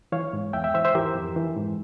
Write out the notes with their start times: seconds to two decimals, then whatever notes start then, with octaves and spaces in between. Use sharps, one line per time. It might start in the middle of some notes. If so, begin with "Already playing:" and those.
0.12 E3 C#5 F5
0.33 G#2
0.53 E2 E5 G5
0.64 E5 G5
0.74 E3 C5 E5
0.85 C5 E5
0.95 E3 G4 A#4
1.15 F2
1.36 E3
1.57 G#2